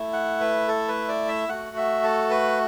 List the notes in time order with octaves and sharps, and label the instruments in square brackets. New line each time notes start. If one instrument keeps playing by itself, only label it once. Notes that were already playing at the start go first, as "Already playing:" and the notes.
Already playing: [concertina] A3 E4
F#5
B4
A4
B4
D5
E5
A3 F#4 F#5
E5
A4
B4